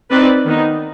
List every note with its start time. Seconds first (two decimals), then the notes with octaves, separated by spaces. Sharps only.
0.11 C4 D#4 B4 D5
0.45 D#3 B3 D#4